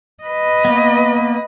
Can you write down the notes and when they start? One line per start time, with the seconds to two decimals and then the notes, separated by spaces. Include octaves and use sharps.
0.23 B4 D#5
0.65 A#3 B3